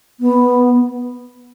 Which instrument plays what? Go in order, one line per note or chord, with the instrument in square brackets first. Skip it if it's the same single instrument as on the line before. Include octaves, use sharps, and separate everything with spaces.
[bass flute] B3